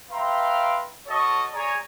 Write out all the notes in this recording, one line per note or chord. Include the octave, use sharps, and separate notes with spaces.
B4 E5 F5 G5 A#5 C6
F#4 A4 C#5 D#5 A5 C#6
G#4 C#5 D5 G#5 A#5